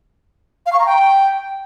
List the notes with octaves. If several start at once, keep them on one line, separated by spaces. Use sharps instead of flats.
F5
C#6
A#5
G5